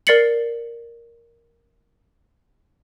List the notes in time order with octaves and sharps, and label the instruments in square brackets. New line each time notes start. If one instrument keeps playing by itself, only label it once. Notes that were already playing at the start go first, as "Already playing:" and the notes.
[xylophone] A#4 D5 A6 C7 C#7 F#7